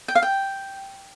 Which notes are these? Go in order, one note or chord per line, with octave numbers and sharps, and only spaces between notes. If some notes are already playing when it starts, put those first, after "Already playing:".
G5
F5
G5